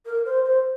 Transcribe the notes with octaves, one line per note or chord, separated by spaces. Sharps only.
A#4
C5
C5